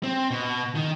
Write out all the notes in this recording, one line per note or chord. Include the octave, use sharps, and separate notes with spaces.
C4
B2
D#3